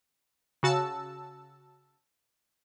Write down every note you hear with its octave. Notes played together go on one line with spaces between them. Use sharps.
C#3 F#4 A5 E6